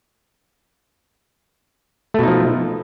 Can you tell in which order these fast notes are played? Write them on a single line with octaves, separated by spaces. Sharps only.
A3 B2 D#4 F3